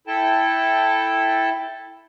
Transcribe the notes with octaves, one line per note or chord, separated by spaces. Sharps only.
E4 A4 G5 A5